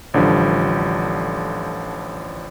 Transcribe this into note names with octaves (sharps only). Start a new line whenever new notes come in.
A1 D3 F3 G3